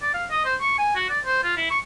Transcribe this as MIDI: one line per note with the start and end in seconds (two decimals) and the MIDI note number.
0.02 0.13 74
0.14 0.25 77
0.30 0.41 75
0.45 0.55 72
0.61 0.77 85
0.78 0.91 80
0.95 1.06 66
1.10 1.19 74
1.25 1.44 72
1.44 1.52 65
1.57 1.69 64
1.71 1.79 85